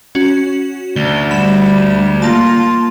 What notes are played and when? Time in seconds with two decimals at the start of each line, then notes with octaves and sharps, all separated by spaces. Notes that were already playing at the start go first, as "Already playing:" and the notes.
0.15 C#4 F#4
0.96 D2 G7
1.31 G3 B5 E7
2.22 A#3 F4 A5